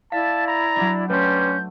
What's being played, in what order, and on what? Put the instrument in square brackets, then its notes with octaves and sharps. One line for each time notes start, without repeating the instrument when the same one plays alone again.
[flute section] E4 D5 [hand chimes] F5 [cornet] A5 [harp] B6
[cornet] A#5 [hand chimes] B5
[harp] F#3 D4
[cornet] G3 [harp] A3 [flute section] C#4 G6 [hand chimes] B4 C6